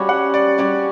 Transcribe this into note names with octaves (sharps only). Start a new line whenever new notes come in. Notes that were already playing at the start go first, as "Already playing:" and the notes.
Already playing: G3 C#4 F#4 C#5
F#5
D5
G3 C#4 F#4 C#5 D5